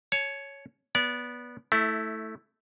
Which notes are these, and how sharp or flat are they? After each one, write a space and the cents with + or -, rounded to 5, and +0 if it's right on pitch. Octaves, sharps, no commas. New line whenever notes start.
C#5 +0 A5 -40
B3 -15 D5 -25
A3 +0 E4 -15